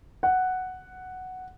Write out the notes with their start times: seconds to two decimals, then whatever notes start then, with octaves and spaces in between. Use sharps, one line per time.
0.23 F#5